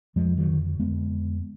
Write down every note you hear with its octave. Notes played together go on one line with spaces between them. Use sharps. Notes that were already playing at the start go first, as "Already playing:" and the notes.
F2 F3 G#3
D#3 F#3
D3
F2 G#3 B3